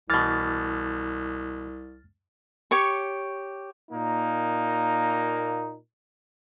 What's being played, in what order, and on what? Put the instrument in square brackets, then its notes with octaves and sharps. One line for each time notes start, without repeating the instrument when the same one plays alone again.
[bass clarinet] C2 [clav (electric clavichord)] B2 E3 [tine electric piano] F6 A6
[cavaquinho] G4 C#5 C#6
[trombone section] A#2 A#3 D#4